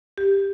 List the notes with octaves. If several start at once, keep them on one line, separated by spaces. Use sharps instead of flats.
G4